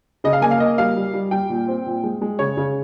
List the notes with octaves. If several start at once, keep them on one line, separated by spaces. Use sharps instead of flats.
C#3 D#5
F5
A#3 G#5
F5
A#3 D#5
G3 F5
G3
G3
G3 G5
A#2
C4
A#2
G#3
G#3
C#3 C#5
C#3